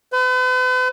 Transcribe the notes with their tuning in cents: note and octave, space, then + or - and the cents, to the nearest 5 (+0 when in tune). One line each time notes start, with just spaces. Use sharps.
B4 +45